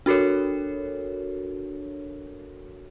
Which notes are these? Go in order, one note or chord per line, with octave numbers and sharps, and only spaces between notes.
D4 F#4 A4 A#4 C#5